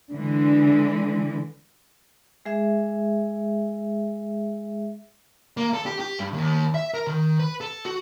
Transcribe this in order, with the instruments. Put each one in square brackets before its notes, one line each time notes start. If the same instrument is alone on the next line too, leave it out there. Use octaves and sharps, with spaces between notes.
[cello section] D3 E3 G#3
[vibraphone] G#3 G#4 E5
[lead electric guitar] A#3
A4
G4
G4
G2
D#2
E5
A#4
D#3
B4
A4
F#4